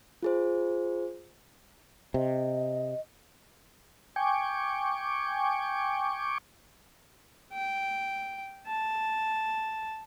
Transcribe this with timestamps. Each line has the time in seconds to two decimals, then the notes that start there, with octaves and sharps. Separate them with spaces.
0.23 F4 G#4 C5
2.14 C3 D#5
4.16 G5 G#5 C#6 D6
7.53 G5
8.67 A5